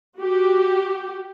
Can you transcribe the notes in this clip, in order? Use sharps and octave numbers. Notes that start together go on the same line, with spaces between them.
F#4 G4